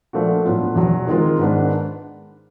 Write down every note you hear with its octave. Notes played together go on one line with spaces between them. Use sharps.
A#2 F3 A3 D4 F#4
A2 F#3 B3 D4 F4
E2 B2 F#3
D#3 G#3 C4 F4 A#4
G#2 D#3 G#3 B3 D4